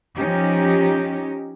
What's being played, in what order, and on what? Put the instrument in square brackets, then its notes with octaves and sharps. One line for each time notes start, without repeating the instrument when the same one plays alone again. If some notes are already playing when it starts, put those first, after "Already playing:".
[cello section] F3 C#4 D#4 G4